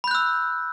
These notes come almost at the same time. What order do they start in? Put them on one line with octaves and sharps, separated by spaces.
B5 G6 F#6 E6